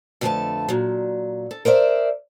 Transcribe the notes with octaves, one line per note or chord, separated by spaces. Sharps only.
F2 D3 A3 G#4 B4 A5
A#2 F#3
A4
A#4 C5 D5 E5